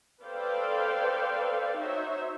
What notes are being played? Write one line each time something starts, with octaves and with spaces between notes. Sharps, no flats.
A4 B4 C5 D5 F5 G5
D#4 F#4 C5 C#5 E5